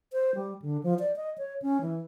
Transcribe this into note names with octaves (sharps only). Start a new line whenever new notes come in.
C5
G3
D3
F3
D5
D#5
C#5
C#4
E3